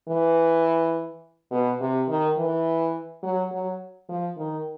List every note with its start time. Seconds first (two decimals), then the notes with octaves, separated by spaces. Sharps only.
0.09 E3
1.51 B2
1.81 C3
2.09 D#3
2.38 E3
3.23 F#3
3.51 F#3
4.09 F3
4.37 D#3